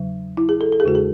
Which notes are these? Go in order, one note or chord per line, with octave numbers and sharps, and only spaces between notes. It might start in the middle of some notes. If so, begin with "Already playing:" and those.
Already playing: E2 C#3 F#3
E4
G#4
A4
A4
G#4
E2 C#3 G#3 F#4
G#4